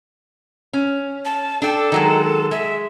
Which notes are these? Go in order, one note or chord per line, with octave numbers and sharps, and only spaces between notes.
C#4
A5
D4 A4 G5
D#3 F#3 G#3
G#3 E5